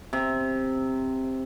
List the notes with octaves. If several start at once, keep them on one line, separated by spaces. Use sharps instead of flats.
C3